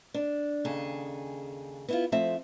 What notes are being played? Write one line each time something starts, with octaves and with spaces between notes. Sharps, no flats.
D4
D#2 C#3 G#4 A4
B3 E4 F4
F3 A3 C4 E5